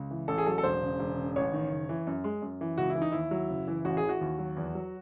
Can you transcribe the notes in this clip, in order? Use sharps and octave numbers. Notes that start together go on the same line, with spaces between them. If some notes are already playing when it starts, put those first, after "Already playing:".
Already playing: C#2
E3
A1 A4
G#4
F#3 A4
A4
E1 C5
C#3
E1
C#3
A1 C#5
D#3
F#1
E3
F#2
G#3
F#2
E3
C#2 F#4
E4
E3
D#4
D#2 E4
F#3
F#1
E3
A1 F#4
G#4
E3
F#4
D#2
F#3
E2
F#3